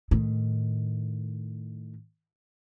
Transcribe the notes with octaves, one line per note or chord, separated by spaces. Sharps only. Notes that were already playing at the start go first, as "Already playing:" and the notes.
A2 D#3